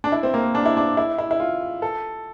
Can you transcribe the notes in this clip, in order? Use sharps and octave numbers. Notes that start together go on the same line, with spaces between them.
D4
E4
C4
A#3
D4
E4
D4
E4
E4
E4
F4
A4